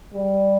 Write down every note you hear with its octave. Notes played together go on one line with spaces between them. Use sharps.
G3